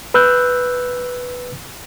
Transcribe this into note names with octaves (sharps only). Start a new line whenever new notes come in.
B4 E6 F#6 G6